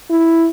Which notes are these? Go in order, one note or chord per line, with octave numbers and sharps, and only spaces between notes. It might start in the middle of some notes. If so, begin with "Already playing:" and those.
E4